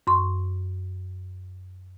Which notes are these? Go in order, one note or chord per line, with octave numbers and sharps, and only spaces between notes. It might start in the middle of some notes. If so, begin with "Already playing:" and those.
F#2 C6 C#6